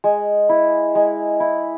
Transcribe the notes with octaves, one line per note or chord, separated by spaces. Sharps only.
G#3
E4
G#3
E4